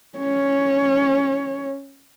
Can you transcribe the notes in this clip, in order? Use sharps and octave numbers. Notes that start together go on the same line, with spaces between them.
C#4 C#5